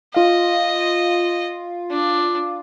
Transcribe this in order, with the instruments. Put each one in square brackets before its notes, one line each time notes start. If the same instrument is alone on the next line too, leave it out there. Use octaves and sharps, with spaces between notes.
[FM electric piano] F4 F5 [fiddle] D#5
[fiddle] D4